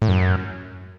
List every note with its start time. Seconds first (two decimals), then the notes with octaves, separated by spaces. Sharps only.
0.02 A2
0.09 F#2